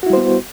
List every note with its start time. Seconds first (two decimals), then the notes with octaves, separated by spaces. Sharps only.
0.03 F#4
0.06 E4
0.10 G3
0.13 C5
0.17 B3